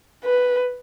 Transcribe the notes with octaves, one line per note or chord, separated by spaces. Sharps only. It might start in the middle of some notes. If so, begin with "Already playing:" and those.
B4